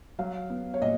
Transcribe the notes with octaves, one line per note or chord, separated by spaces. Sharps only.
F#3 F5
B3
C#5
A#2 D#5